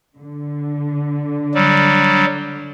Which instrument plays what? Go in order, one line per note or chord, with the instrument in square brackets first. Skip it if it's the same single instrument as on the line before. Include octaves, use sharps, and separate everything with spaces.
[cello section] D3
[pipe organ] F#3 G3